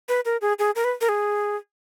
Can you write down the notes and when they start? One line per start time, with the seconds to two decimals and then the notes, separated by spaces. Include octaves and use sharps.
0.09 B4
0.25 A#4
0.41 G#4
0.59 G#4
0.75 A#4
0.84 B4
1.01 A#4
1.09 G#4